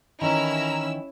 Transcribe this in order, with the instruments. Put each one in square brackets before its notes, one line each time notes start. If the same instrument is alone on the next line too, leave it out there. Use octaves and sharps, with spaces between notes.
[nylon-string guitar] D#3 E3 [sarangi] C#4 [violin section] E4 E6 [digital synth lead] A#5